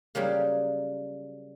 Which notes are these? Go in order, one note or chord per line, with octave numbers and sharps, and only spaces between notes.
C#3 F#3 G3 A#3